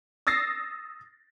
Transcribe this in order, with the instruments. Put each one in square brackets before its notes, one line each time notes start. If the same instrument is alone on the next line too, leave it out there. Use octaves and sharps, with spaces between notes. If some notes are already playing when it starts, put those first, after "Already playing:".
[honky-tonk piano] D#6 E6 A6 A#6 C7